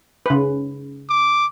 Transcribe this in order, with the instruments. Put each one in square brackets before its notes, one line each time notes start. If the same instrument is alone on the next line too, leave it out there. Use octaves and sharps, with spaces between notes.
[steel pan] C#3 B4
[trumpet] D6